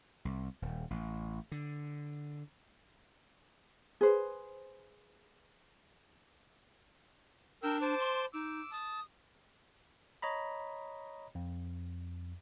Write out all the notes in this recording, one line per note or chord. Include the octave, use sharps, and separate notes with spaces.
C2
D#1
A1
D3
G#4 B4 C5
D4 A#4 G5 E6
C5 A5 D6
C6
D#4 D6 E6
A5 D#6
C#5 D#5 A#5 B5
F2